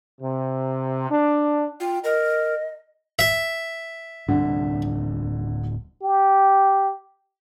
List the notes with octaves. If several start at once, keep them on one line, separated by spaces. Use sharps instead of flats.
C3
D4
F4 G5
A#4 D#5
E5
D1 D3 G3 C4
G4